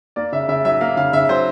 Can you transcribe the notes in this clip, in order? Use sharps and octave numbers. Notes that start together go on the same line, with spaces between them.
A#3 D5
C#3 E5
C#3 E5
F#3 E5
A#3 F5
C#3 F5
C#3 E5
F#3 C5